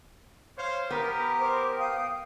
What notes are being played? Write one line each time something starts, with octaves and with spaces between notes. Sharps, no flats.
C5 C#5 F5
B3 G4 A#4
C5 D6
F5 G5 D#6